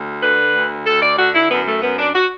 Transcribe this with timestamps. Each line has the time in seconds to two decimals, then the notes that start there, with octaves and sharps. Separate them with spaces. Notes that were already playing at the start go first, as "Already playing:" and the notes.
Already playing: D2
0.22 D3 B4
0.54 D2
0.86 D2 A4
1.02 D5
1.18 D3 F#4
1.34 E4
1.50 F#2 B3
1.67 A3
1.82 F#2 B3
1.98 D4
2.15 F#4